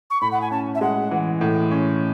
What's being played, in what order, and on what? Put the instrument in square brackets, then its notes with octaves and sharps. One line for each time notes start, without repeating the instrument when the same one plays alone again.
[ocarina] C#6
[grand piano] A2 [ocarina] B5
[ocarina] F#5
G#5
[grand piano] C#4 [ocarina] A5
[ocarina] E5
[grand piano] G#3 [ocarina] F#5
[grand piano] E3
A2
C#4